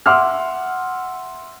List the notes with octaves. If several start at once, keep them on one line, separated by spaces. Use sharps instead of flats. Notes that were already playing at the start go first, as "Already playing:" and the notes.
E5 F#5 C6 D6 E6 F6